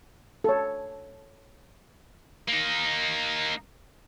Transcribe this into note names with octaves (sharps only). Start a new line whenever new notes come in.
A4 C#5
A#3 D#4